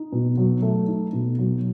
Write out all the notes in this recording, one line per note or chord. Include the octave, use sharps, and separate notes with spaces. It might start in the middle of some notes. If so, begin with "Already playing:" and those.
Already playing: D#4
B2
F#3
A3
D#4
B2
F#3